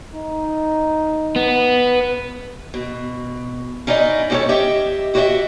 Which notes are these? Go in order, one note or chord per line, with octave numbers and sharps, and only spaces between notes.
D#4
B3
B2
C#4 D#4 E4 D5 D#5
G#2 C#4 D#4 G4 A4 C#5
G4 D#5 E5
E4 F#4 G4 C#5 D#5 E5